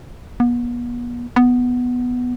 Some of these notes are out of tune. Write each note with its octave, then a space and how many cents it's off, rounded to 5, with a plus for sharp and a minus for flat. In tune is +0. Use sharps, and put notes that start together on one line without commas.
B3 -40
B3 +0